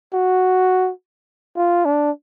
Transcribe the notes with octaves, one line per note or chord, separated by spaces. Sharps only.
F#4
F4
D4